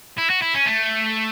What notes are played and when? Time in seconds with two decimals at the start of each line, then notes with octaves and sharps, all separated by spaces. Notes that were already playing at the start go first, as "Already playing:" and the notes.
0.18 E4
0.30 F#4
0.42 E4
0.54 C#4
0.66 A3